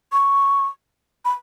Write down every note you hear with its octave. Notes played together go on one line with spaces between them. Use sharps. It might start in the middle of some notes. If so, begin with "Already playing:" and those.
C#6
B5